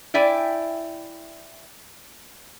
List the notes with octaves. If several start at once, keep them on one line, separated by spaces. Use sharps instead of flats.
E4 D5 E5 G5 G#5